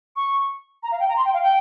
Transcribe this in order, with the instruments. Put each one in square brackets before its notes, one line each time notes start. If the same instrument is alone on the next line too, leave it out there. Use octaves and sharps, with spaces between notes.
[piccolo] C#6
A#5
F5
G5
A#5
C6
G5
F5
G5